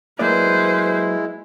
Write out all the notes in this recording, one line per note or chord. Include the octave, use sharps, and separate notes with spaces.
F#3 G#3 A#3 E4 B4 C5 D5